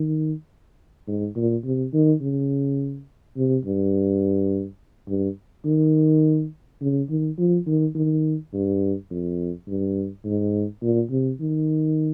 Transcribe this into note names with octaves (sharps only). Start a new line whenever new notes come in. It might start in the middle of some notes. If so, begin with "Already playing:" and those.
Already playing: D#3
G#2
A#2
C3
D#3
C#3
C3
G2
G2
D#3
C#3
D#3
F3
D#3
D#3
G2
F2
G2
G#2
A#2
C3
D#3